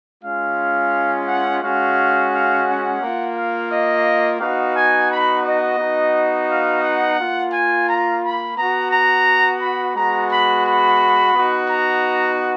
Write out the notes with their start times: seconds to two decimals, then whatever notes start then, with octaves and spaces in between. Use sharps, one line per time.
0.23 G#3 C#4 F4 F5
1.27 F#5
1.62 G#3 C#4 F#4 F5
2.31 F5
2.66 F#5
3.01 A#3 F4
3.35 F5
3.70 D#5
4.40 B3 D#4 F#4 F5
4.75 G#5
5.09 B5
5.44 D#5
5.78 B3 D#4 F#4
6.48 F5
6.83 F#5
7.18 A#3 F4
7.53 G#5
7.87 A#5
8.22 B5
8.56 B3 F#4 A#5
8.91 A#5
9.61 B5
9.95 G#3 B3 F#4 A#5
10.30 B5
10.65 B5
11.35 B3 D#4 F#4
11.69 A#5